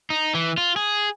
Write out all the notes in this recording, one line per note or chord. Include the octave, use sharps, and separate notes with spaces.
D#4
E3
F4
G#4